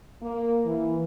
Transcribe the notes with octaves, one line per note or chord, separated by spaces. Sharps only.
A#3
E3